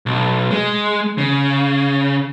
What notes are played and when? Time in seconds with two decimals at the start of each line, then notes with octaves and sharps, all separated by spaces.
0.06 B1
0.51 G#3
1.18 C#3